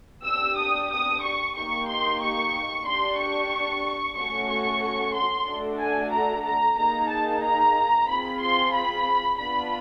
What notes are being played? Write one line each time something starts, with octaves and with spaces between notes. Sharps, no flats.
D4 G4 E6
D#6
D#6
C#6
A#3 D#4 G4 C#6
C6
C#6
D4 G4 C6
C#6
A3 C#4 F#4 A4 C#6
C#6
C6
A3 D4 F#4 A4
G#5
A#5
A#5
A#3 D#4 G#4 A#5
A5
A#5
C4 F4 G#4 B5
C6
B5
B3 D4 F4 B5